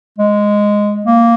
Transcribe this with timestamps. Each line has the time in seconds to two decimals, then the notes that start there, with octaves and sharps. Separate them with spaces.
0.18 G#3
1.06 A#3